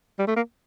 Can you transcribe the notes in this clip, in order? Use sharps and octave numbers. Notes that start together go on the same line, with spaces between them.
G3
A3
A#3